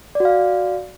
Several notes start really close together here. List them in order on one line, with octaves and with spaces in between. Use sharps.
D5 F#4 F5